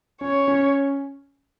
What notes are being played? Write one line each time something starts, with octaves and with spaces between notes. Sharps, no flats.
C#4 C#5
C#4